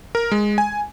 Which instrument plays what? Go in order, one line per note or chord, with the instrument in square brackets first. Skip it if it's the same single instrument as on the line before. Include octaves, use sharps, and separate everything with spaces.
[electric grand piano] A#4
G#3
G#5